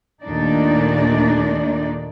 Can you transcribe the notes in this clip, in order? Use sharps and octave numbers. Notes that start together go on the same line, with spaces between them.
D#2 A#2 A3 D4 D#4 D5